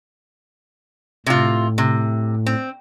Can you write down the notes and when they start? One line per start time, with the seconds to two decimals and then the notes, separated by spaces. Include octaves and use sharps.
1.26 A2 C3 F4
1.78 C3
2.46 C4